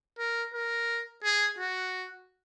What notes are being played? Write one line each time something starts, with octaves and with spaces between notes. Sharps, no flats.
A#4
A#4
G#4
F#4